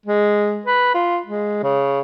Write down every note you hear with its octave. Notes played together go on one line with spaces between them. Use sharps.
G#3
B4
F4
G#3
C#3